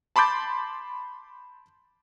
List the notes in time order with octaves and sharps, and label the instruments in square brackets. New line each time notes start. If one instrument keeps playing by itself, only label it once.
[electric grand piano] A5 B5 C6 D6 G6 A6